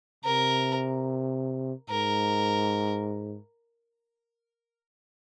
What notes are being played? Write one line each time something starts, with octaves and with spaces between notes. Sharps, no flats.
C3 A#4
G#2 A#4